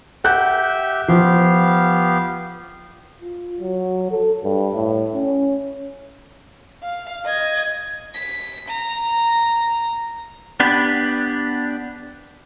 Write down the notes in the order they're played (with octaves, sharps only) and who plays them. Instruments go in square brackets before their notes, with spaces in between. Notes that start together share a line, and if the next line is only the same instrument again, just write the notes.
[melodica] G4 E5 G5 [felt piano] F#5 F#6 G6
[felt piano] F3 [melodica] B3 G4 F5
[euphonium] F4
F#3
A4
G2
A2
C#4
[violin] F5
D#5 G#6
B6
A#5
[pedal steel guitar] B3 D4 G4 B4